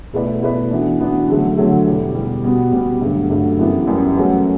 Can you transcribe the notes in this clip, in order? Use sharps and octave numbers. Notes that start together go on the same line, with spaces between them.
B2 A3 E4 B4 D5
B2 A3 E4 B4 D5
E3 B3 D4 F#4
E3 B3 D4 F#4
D3 F#3 A3
D3 F#3 A3
E2 B2 G3
E2 B2 G3
B2 G3 B3 F#4
B2 G3 B3 F#4
G2 D3 F#3 A3
G2 D3 F#3 A3
F#2 E3 G3 B3 E4
F#2 E3 G3 B3 E4
F#3 A3 C#4 F#4 B4